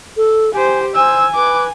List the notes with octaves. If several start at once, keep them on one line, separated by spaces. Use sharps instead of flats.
A4
G4 C5 G#5
C5 G#5 E6
B4 D6